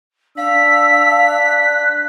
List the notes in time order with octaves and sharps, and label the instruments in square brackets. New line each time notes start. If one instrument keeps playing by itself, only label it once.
[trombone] D4 [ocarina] F5 [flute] E6 [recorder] B6
[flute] F#6